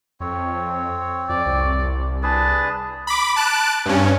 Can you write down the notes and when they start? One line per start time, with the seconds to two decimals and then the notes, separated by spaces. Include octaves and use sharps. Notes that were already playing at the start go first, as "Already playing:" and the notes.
0.20 F2 C4 C#5
1.29 F2 D5
1.46 C2
2.23 D4 G#4 B4 A5
3.07 B5 D6
3.36 A5 F#6 D7
3.86 G2 C#4